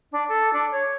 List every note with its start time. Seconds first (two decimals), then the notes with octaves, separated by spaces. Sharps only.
0.12 D4
0.29 A4
0.53 D4
0.71 C#5